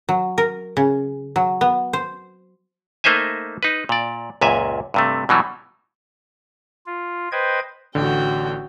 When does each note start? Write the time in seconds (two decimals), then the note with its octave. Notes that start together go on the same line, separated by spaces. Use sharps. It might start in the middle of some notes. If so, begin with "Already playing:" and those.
0.09 F#3
0.38 A#4
0.77 C#3
1.36 F#3
1.61 B3
1.93 C5
3.04 A3 A#3 D#4 C5 E5 G#5
3.63 D#4 B4
3.89 A#2 D5
4.41 C#2 F#2 A#2 E5 G#5
4.94 G2 C3 A3
5.29 B2 E3 F#3 G3
6.86 F4
7.32 B4 C5 D#5 G5 G#6
7.95 A1 D3 F#4 G5